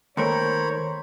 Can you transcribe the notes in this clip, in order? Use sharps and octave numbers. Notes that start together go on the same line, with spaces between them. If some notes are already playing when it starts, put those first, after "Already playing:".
D#2 A3 A#4 C5 C#5 A#5 B5